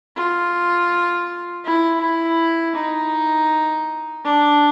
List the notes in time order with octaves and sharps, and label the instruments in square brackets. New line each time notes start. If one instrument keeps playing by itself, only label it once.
[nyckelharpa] F4
E4
E4
D#4
D4